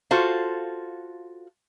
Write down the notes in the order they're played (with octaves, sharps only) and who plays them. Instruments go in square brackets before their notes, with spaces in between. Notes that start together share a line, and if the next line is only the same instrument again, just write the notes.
[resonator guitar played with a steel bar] F4 F#4 A4 C5 F5